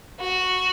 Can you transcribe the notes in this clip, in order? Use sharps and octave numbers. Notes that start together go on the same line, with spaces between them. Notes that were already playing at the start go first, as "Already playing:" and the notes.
F#4